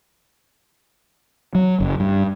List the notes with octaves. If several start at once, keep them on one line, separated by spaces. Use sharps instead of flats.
F#3
F#1
G2